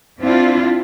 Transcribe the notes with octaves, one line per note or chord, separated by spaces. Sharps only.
C4 D4 E4 F4